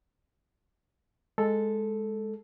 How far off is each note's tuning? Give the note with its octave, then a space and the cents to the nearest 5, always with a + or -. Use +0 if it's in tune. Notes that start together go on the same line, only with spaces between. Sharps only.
G#3 +0 A4 +0